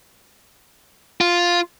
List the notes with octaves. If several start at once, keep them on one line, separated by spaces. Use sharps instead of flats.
F4